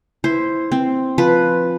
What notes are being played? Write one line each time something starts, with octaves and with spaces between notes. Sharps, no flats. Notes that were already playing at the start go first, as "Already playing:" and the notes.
E4 C5
C4
F3 B4